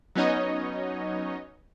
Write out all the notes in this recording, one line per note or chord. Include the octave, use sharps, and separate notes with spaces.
F#3 B3 C#4 D#4 C#5 D#5